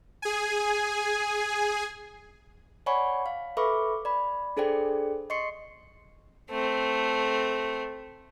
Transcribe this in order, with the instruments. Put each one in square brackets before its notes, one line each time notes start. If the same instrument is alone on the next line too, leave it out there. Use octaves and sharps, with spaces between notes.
[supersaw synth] G#4 G#5
[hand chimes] C#5 D5 F#5 G#5 B5 C#6
F5
A4 B4 E5 B5 C#6 D6
D5 B5
D4 G#4 A4 C5 D5 G5
D#5 C6 C#6 C7 C#7
[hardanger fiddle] A3 C4